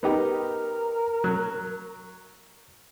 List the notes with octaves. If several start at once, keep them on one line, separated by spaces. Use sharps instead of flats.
B3 D#4 G4 A#4
F#3